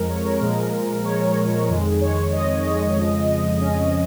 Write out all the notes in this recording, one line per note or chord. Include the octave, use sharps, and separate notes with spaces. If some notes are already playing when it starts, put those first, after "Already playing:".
Already playing: F2 F3 G#3 A#4
C#5
A#4
A#2 F3 G#3
C#5
F2 D#3 G#3
C#5
D#5
F2 C#3 F3 G#3
C#4